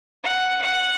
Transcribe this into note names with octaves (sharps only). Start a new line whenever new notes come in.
F#5
F#5